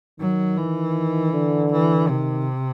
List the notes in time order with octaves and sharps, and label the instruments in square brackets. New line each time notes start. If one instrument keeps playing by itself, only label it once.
[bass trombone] D#3 [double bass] F#3
[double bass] E3
[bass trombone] D3
[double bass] E3
[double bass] C3 [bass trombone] D#3